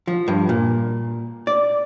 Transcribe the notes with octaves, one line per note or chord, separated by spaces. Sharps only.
F3
G2
A#2
D5